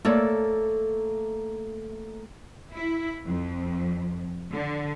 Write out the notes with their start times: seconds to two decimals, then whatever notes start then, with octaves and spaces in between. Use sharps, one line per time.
0.05 A3 A#3 A4 C#5 D5
2.73 E4
3.27 F2
4.51 D3